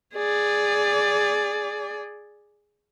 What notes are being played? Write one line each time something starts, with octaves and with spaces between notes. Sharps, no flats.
G#4 D5